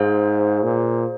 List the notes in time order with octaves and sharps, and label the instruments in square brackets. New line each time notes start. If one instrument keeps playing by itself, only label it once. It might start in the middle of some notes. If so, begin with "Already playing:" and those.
Already playing: [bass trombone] G#2 [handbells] G#4 C5 F5
[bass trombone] A#2